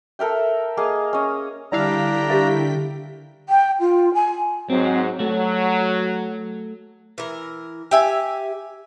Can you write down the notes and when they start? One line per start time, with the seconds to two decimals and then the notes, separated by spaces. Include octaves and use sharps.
0.19 A4 A#4 E5 G5
0.77 A#3 G#4 D#5 F5
1.13 C#4 D#5
1.72 D3 G3 D4 E4 F5 G5 A#5 B6
2.30 G4 A#4 E5
3.49 G5
3.80 F4
4.14 G#5
4.70 G#2 F#3 C4
5.19 F#3 A3 F#4
7.18 E3 A#4
7.91 G4 E5 G#5